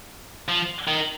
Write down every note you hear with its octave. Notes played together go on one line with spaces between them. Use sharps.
F3
D#3